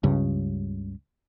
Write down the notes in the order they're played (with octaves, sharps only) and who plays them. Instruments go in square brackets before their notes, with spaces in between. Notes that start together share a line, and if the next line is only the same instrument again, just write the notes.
[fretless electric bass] C#2 G2 C#3